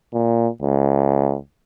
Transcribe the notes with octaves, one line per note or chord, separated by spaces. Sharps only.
A#2
C#2